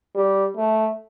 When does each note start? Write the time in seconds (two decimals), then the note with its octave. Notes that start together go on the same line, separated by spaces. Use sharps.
0.15 G3
0.57 A3